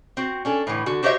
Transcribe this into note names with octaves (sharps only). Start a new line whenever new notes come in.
C4 F#4
C#4 D4 A4
A2 D3 E3
D3 F#4
F#4 G4 C5 C#5 D#5 E5